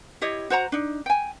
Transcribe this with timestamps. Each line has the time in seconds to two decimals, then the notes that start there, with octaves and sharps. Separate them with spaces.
0.21 E4 G4 C#5 D#5
0.50 F#4 C5 F#5 A#5
0.72 D4 D#4
1.06 G5 G#5